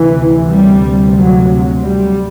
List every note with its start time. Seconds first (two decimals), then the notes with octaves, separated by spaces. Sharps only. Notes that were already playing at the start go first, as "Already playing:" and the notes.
Already playing: D2 C3 E3
0.49 G3
1.17 F#3
1.86 G3